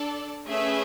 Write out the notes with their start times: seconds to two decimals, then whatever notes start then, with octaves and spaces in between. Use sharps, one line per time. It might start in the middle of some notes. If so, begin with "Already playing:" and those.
Already playing: D4 A4 D5 A5
0.46 A3 C#4 G#4 B4 E5